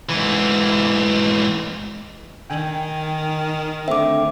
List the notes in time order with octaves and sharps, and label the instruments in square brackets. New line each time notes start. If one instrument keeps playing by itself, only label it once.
[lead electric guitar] G#2 E3
[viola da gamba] D#3 [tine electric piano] G5 G#5
[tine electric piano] D3 A3 C4 [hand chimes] E5 D6